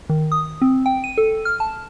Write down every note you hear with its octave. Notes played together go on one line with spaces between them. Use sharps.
D#3
D#6
C4
G5
D#7
A4
F6
A5